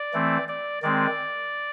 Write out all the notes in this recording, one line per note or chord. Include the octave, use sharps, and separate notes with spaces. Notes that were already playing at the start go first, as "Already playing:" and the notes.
Already playing: D5
E3 A3 C4
D5
D#3 G#3 C4 D5